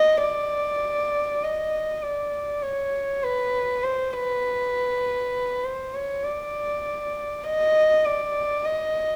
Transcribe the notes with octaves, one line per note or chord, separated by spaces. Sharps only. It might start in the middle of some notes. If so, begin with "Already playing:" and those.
Already playing: D#5
D5
D#5
D5
C#5
B4
C5
B4
C5
C#5
D5
D#5
D5
D#5